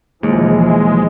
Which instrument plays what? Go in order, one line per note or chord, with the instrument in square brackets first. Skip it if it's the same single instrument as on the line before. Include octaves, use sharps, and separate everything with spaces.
[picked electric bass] D#2 [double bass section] B2 E3 F3 [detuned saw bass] G#3